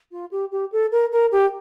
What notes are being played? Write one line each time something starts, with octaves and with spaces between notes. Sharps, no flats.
F4
G4
G4
A4
A#4
A#4
G4